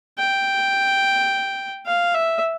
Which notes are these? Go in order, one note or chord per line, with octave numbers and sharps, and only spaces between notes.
G5
F5
E5